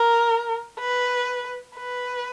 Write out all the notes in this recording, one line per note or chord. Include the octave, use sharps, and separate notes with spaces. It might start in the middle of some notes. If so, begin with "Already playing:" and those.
Already playing: A#4
B4
B4